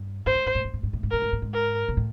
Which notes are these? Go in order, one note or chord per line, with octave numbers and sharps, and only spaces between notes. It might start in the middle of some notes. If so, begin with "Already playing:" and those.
Already playing: G2
G#2 C5
A2
G#2
A2
G#2
A2
G#2
A2
G#2
A2 A#4
G#2
A2
G#2
A#4
A#2
A2